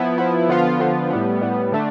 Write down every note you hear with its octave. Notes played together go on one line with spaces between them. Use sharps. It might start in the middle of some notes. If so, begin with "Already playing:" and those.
Already playing: F3 B3 E4
F3 B3 E4
D3 F3 B3 F4
D3 F3 B3 F4
A2 G3 B3
A2 G3 B3
D3 A3 D4